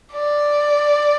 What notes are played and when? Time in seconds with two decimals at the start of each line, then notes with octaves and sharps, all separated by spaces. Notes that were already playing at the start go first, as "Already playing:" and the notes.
0.13 D5